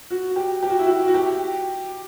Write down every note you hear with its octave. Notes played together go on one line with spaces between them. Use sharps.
F#4
G4
G4
F#4
E4
F#4
F#4
G4